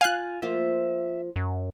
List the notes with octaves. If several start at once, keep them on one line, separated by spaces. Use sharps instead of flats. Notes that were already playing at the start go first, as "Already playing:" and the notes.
F4 F5 G#5 F#6
F3 A#3 F4 E5
F#2